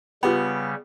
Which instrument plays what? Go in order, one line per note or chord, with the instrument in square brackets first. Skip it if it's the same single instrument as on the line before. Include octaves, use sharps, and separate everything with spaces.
[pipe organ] C#3 G3 [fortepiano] B3 [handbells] F4 G4 G5